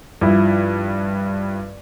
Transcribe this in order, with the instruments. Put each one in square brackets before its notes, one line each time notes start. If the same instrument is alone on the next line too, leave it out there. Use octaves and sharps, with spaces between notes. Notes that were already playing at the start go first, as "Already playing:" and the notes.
[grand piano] G2 F3 E4